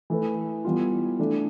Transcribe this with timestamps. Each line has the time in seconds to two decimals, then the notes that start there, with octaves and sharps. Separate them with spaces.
0.10 E3 A3 E4 B4
0.65 E3 G3 B3 F4
1.19 E3 A3 D4